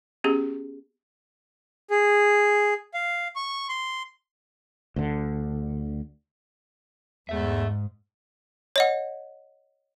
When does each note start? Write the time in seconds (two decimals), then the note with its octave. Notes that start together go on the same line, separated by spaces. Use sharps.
0.24 B3 C#4 G4 G#4
1.90 G#4
2.94 F5
3.36 C#6
3.69 C6
4.96 D2 D3
7.29 E2 G#2 A3 E5
8.76 C#5 D#5 F#5